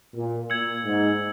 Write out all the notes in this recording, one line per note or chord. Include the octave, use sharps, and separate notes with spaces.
A#2
A#2 E6 G#6 C#7 F#7
G#2